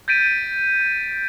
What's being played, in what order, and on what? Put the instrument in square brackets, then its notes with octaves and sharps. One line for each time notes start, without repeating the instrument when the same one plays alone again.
[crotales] G6 A6 B6 D7 D#7